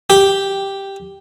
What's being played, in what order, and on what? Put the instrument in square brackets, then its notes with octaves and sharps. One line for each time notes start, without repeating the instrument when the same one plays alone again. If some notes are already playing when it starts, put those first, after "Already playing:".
[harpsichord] G4